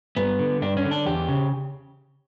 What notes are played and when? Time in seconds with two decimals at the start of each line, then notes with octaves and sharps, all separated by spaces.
0.17 G2 B3
0.39 D3
0.62 G2 D4
0.77 C#4
0.84 D3
0.91 D4
1.05 E2 G4
1.29 C#3